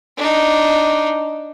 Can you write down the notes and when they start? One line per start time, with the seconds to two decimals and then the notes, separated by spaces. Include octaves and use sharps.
0.17 D4 D#4